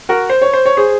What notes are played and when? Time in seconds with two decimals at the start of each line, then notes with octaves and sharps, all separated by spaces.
0.09 F#4 A#4
0.30 C5
0.42 C#5
0.53 C5
0.66 C#5
0.77 G#4 C5